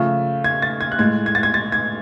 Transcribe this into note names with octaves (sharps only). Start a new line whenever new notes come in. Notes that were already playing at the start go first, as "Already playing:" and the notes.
Already playing: C#3 F3 A3
G#6
A6
G#6
F#6
A2 G#3 G#6
G#6
A6
G#6
A6
G#6